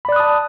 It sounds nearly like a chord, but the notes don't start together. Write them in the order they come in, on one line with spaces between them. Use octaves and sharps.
B5 D5 F#6 D#6 A5